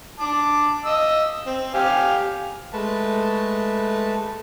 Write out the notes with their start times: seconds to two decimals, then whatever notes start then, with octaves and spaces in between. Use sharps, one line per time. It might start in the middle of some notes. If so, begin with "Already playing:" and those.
0.20 A5 D6
0.85 D#5 E6
1.47 C4
1.74 G4 F5 G#5
2.73 G#3 A3 B4 A5